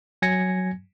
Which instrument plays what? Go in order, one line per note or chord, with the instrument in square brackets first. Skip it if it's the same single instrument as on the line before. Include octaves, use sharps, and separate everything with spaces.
[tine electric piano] F#3 G#5 G#6 A#6 C#7